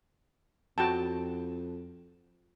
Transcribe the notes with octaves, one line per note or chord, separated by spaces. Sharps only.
F2 F#4 G5 A5